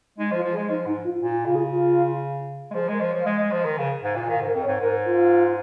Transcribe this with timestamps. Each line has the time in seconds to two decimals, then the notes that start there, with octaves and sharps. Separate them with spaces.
0.18 G#3 D#4
0.31 F3
0.35 F4
0.43 F3
0.52 G#4
0.56 G#3
0.69 F3 D#4
0.86 G#2 D#4
1.04 F4
1.21 A#2 F4
1.43 C#3 F4
1.55 G#4
1.72 F4
2.71 G#3
2.74 F3 G#4
2.88 G#3 A#4
3.01 F3
3.10 C#5
3.14 F3
3.20 F5
3.26 G#3 D#5
3.39 G#3
3.52 F3
3.65 D#3
3.78 C#3
4.03 G#2
4.16 A#2
4.29 D#3 F5
4.41 G#2 A#4
4.55 F2
4.63 C#5
4.67 G#2
4.80 G#2 A#4
5.05 F4